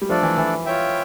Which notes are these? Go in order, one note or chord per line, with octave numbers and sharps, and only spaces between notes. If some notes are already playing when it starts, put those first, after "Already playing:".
G3
F3 A3 D4 A4 D5
E3
E3
F4 C#5 E5 G5